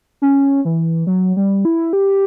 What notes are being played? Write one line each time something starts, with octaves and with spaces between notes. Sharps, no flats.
C#4
E3
F#3
G3
E4
G4